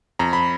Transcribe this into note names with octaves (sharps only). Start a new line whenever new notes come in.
F2 A#5
B5